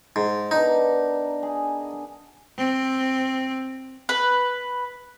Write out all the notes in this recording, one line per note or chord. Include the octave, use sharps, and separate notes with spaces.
G#2
B3 D4 D#4 A#4
G#4
C4
B4